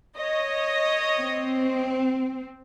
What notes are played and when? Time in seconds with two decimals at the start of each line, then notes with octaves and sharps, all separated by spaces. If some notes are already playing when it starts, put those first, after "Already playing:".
0.16 C#5 D#5
1.18 C4